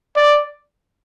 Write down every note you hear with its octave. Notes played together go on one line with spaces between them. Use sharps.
D5